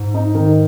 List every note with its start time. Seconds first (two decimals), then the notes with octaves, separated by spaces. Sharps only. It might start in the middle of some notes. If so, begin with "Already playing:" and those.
Already playing: G#2
0.14 D#4
0.35 D#3